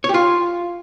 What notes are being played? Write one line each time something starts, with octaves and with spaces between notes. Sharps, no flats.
C#5
G4
F4